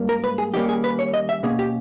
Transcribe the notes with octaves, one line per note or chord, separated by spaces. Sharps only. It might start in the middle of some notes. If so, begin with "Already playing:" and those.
Already playing: G#2 G3 A#3 C#4
A#4
B4
G#4
D#2 D#3 G3 A#3 C#4 G4
G#4
B4
C#5
D#5
E5
B2 A#3 C#4 G#4
G4